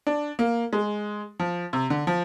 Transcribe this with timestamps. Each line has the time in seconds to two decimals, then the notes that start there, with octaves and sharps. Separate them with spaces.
0.07 D4
0.39 A#3
0.73 G#3
1.39 F3
1.73 C3
1.90 D3
2.07 F3